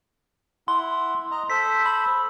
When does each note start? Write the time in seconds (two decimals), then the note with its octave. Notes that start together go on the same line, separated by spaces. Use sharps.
0.68 E4 F#5 C6
1.31 D#5 A#5
1.50 A4 C5 B6
1.86 B5